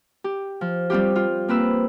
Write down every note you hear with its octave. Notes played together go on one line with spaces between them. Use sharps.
G4
F3
G3 C4 F4 G4
F4
A#3 C4 B4 E6